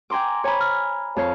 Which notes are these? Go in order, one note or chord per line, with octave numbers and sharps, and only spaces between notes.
G5 G#5 A#5 C6 D6
C#5 G#5 A#5 B5
F6
F2 C#5 F5